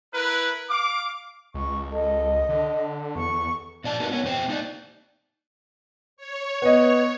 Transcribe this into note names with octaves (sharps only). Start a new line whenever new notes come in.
E4 A#4 B4
F5 D6
C#2 C#6
A4 D#5
D3 A4
E2 C#6
A#2 D5 A5
A#3 D#4 F#4 A#4 B4
B3 C#5
E2 A#2 C5 G5
A#3 D#4 D5
C#5
B3 D#5